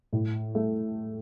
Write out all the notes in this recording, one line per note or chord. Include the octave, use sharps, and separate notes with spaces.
A2
A3